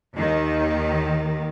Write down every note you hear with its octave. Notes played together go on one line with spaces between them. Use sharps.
D#2 D#3